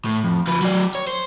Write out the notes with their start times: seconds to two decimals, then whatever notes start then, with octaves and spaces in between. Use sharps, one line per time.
0.05 A2
0.24 F2
0.47 F3 B4
0.61 F#3 D5
0.95 C#5
1.07 C5